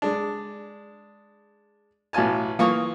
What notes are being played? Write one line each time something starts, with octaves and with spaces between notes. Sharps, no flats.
G#3 D4
A1 B2 F4 G#5 A5
E3 A#3 F4 C#6 D#6